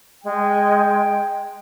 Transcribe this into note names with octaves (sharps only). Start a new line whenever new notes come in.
G#3 G5